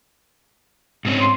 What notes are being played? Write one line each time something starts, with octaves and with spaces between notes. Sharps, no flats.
G#2 C4 C#4
C6